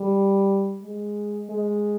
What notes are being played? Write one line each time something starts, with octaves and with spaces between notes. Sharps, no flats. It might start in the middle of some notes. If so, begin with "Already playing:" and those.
Already playing: G3
G#3
G#3